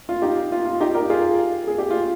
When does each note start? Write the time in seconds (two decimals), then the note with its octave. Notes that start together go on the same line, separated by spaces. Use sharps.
0.09 F4
0.22 D#4 G4
0.52 F4
0.65 F4
0.80 D#4 G4
0.94 G4 A#4
1.10 F4 G#4
1.67 G#4
1.78 G4
1.90 F4